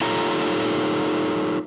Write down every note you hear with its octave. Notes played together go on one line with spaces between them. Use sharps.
D#4 F4 G4 A4 C#5 A#5